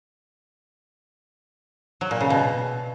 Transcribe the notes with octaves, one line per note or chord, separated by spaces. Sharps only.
F#3
A#2
C#3
B2